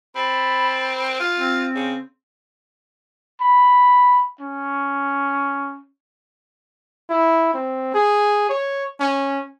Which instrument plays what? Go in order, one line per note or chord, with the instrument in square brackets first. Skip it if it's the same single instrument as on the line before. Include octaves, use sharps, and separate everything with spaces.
[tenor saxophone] C4 [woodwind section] A5 B5
[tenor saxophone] F4
[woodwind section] C4
[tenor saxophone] C#3
[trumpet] B5
C#4
[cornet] E4
C4
G#4
C#5
C#4